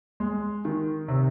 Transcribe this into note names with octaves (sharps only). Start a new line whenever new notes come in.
G#3
D#3
C3